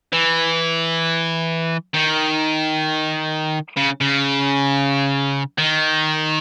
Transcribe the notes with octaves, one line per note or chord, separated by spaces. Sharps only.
E3
D#3
C#3
C#3
D#3